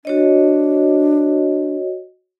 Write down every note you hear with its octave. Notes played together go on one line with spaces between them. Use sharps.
D4 F#4 C#5 D#5